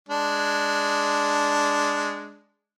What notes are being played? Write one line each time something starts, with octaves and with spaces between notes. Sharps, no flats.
G#3 D4